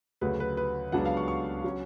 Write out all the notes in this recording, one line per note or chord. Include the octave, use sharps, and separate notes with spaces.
D2 C#3 F#3 B4
B4
B4
C#2 C#3 F#3 B3 D4 F#5
F5
C#6
C#6
F#3 C#4